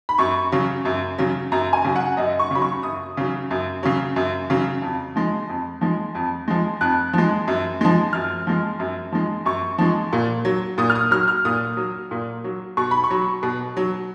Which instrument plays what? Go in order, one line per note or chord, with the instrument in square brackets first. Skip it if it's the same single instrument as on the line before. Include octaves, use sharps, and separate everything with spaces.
[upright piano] B5
F#2 C#6
C#3 F#3
F#2
C#3 F#3
F#2 A#5
G#5
C#3 F#3
F#5
F#2 D#5
C#6
C#3 F#3 B5
C#6
F#2 D#6
C#3 F#3
F#2
C#3 F#3
F#2
C#3 F#3
F2
F3 G#3
F2
F3 G#3
F2
F3 G#3
F2 F#6
F3 G#3
F#2
F3 G#3
F#2 F6
F3 G#3
F#2
F3 G#3
F#2 C#6
F3 G#3
A#2
F#3
A#2 D#6
F6
D#6
F#3 F6
F6
A#2 D#6
F#3
A#2
F#3
B2 C#6
B5
C#6
F#3
B2
F#3